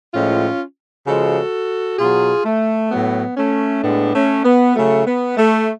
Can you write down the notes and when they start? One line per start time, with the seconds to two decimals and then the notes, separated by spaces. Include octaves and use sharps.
0.14 A2 F3 G#3 C#4 F4
1.06 C#3 F3 G#3 F#4 A4
1.99 B2 F#3 F4 G#4
2.45 A3
2.91 A2 F#3 B3
3.37 A3 C#4
3.83 A2 G#3 B3 D4
4.14 A3 C#4
4.44 B3
4.75 C#3 F#3 A3
5.05 B3
5.37 A3